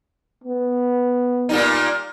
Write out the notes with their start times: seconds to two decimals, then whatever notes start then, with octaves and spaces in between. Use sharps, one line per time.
0.44 B3
1.49 A#2 G3 D#4